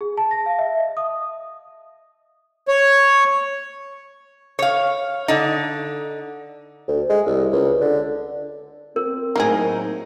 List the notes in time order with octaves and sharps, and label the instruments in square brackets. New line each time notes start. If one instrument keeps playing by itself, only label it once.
[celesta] G#4
A5
A#6
F5
E5
D#5
D#6
[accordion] C#5
[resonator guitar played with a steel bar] C#5 F5
D3 D#4
[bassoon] D2
G#3
C2
C#2
D3
[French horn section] C4 [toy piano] A#4
[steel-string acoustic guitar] A2 F#3 D#4 [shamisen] A#3 G#4